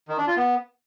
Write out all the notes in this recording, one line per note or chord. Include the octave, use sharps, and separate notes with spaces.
D#3
D4
F4
B3